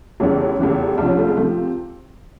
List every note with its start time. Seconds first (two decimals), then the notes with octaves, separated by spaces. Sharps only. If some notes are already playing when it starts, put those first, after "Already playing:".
0.20 F1 E2 C#3 E3 C#4
0.59 F1 E2 C#3 E3
0.97 C2 C3 F3 D4
1.08 C#4
1.17 A3
1.27 G#3
1.37 C3 F3 A3